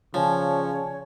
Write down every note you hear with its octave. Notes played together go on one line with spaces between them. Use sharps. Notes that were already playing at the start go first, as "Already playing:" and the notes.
C#3 F3 C#5 D5 G#5 A5